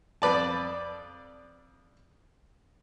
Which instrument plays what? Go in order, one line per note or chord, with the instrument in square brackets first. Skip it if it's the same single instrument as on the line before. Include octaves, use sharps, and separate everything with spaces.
[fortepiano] F2 B4 D5 A5